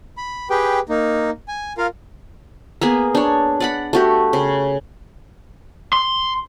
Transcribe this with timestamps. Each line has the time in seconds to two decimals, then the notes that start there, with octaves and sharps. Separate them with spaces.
0.17 B5
0.50 G4 G#4 B4 G5
0.89 A#3 D#4
1.48 G#5
1.78 F4 A#4 F5
2.81 A#3 B3 G#4
3.15 D4 C#5
3.60 D5 F#5 B5
3.93 A3 F#4 G4
4.33 C#3
5.93 C6